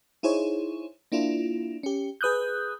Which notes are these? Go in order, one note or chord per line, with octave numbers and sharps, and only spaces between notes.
D#4 E4 G#4 C5 C#5
A#3 D4 E4 F4
C#4 G4
G#4 B4 D#6 F#6 G6